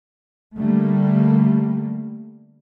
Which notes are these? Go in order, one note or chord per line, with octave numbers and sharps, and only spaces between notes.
D3 G3 A3 A#3